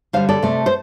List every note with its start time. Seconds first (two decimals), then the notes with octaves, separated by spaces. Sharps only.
0.13 D3 G3 C5 F5
0.29 A4 D5
0.42 C3 A3
0.66 C5